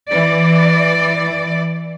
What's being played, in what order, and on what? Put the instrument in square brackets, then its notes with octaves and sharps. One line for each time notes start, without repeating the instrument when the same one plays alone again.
[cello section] E3 D5